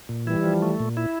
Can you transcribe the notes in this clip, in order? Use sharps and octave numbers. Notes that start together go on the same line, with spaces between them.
A#2
E3 G3 E4
F3
A3
A#2
E4